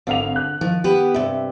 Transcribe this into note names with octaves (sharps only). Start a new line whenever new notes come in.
G#1 D3 F5 F7
F#6
D#3 F3
B3 G4 B4
G2 C3 E5